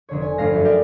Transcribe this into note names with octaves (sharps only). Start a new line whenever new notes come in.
F1 D3 C#5
C#5 G#5
G1 A3 F5 A#6
F#2
D#4 G4 A#4 D5